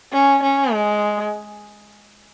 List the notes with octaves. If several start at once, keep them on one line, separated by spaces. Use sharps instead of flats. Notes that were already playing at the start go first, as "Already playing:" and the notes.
C#4
C#4
G#3